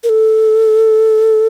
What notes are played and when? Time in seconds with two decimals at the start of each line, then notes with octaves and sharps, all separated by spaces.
0.04 A#4
0.09 A4